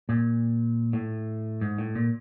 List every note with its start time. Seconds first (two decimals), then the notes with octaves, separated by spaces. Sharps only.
0.09 A#2
0.93 A2
1.61 G#2
1.78 A2
1.95 A#2